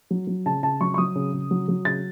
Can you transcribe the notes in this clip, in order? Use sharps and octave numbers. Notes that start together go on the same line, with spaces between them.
F#3
F#3
C#3 A5
C#3 A5
F#3 C#6
C#6
F#3 D#6
C#3
C#3
F#3
F#3
C#3 A6